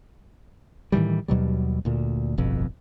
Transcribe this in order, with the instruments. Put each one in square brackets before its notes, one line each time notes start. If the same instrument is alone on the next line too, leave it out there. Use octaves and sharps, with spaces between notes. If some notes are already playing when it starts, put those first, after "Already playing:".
[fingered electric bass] A2 D#3 E3 G3
D#2 B2 F#3 G3
D2 A#2
D1 G1 F2 B2